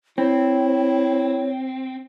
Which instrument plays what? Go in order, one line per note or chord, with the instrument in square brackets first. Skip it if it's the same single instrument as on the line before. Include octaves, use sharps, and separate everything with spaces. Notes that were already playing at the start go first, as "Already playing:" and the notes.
[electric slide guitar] C4 [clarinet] E4 [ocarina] C#5